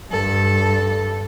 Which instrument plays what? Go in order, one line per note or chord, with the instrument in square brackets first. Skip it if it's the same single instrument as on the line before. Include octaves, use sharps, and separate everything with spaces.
[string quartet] G2 A4